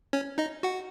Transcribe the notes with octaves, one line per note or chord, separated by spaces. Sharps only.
C#4 C#5
D#4 D#5
F#4 F#5